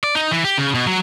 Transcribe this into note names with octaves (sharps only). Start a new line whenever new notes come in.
D5
D#4
E3
G4
C#3
B2
F#3